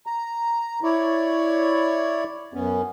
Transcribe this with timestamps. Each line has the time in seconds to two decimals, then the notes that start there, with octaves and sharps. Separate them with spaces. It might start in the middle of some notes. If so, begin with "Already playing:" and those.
0.06 A#5
0.83 E4 C#5 D5
2.54 F#2 B3 C#4